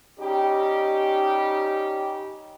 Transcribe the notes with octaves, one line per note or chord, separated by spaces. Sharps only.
G3 C#4 D#4 G4